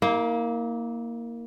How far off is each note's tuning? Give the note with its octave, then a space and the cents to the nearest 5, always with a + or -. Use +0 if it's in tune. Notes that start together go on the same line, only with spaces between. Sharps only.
A#3 +0 E4 -45